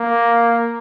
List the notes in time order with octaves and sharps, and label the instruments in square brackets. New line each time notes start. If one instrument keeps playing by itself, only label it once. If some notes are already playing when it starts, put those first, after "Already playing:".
Already playing: [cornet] A#3